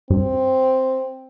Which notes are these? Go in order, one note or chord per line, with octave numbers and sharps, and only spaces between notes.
G2 C4